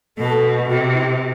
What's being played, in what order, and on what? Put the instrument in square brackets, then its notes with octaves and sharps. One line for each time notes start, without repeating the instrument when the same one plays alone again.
[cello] B2 [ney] A4
[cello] C3 [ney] F#4
[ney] E4